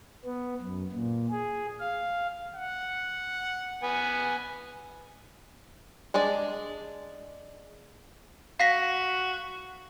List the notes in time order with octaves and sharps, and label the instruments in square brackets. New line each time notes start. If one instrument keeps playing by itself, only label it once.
[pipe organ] B3
F#2
A#2
G#4
F5
[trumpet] F#5
[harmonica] B3 G#5
[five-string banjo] G#3 D4 G#4 D5
[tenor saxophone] F#4 [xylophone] F5 A#6 B6